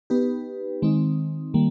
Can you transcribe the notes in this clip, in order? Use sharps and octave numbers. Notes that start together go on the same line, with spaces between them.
B3 D#4 G4 B4
D#3 G#3 C4 D#4
D#3 G3 A#3